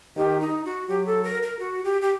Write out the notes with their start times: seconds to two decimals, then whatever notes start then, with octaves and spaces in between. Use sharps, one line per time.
0.17 D#3 G4
0.40 D#4
0.65 F#4
0.89 F#3 G4
1.06 A4
1.24 A#4
1.42 A#4
1.59 F#4
1.84 G4
2.01 G4